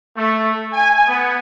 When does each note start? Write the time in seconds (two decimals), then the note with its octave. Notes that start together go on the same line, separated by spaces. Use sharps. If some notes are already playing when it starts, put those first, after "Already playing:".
0.15 A3
0.73 G#5
1.06 B3